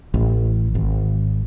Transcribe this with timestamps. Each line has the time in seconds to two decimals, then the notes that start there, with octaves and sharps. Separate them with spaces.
0.14 A1
0.75 G#1